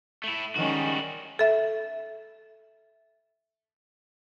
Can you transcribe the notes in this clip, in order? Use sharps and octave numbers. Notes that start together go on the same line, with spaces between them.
A3 E4
D#3 G3 G#3 C#4 F#4
A4 E5